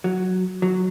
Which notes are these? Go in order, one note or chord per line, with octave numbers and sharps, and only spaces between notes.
F#3
F#3